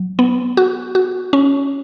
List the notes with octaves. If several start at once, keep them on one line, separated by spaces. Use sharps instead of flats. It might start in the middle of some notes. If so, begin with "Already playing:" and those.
Already playing: F#3
B3
F#4
F#4
C#4